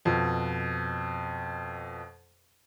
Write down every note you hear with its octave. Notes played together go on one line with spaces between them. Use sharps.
F2 B2